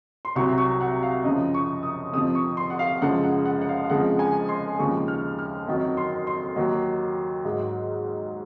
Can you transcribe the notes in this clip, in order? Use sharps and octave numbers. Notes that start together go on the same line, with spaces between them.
C6
C2 C3 F#3 C#6
C#6
F#5
F5
F#2 C#3 F3 D#5
C#6
D#6
F2 C3 F3 D#6
C#6
C6
F#5
F5
F#2 C#3 F3 G#3 F#5
F#5
F#5
F#5
F5
F5
F2 C#3 F3 G#3 F#5
G#5
C6
D#2 C#3 F3 G#3 C#6
F6
F6
F2 D#3 F#3
C6
C6
D#2 D#3 F#3
G#2 F#3